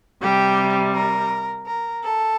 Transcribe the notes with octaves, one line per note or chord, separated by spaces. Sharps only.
C3 G3 G4
A#4
A#4
A4